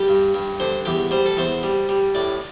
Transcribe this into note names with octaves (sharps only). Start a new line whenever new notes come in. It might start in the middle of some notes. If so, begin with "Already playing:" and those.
Already playing: G3 G4
G2
G2
D3 C5
E2 G4
G3 C5
A4
E2 C5
G3
G3
A2 D5